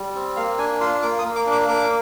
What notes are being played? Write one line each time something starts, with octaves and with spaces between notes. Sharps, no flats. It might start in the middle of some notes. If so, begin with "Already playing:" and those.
Already playing: G3
C4
A#3 F5
D4 G#5
F4 C6
A#3 D6
D#6
A#3
D6
D4
D6
A#3 D6